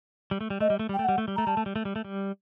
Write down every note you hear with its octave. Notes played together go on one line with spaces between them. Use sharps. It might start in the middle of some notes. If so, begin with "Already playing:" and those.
G3
A3
G3
A3 D#5
G3
A3
G3 G5
A3
G3 F#5
A3
G3
A3 A#5
G3 A5
A3
G3
A3
G3
A3
G3